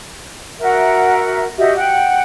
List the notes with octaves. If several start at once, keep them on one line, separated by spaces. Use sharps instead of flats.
F#4 A#4 E5 F#5
F#4 G4 D#5 E5
F#5 G5